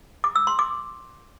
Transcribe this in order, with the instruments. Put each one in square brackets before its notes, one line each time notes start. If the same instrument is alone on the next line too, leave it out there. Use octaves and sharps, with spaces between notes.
[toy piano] D6
E6
C6
D6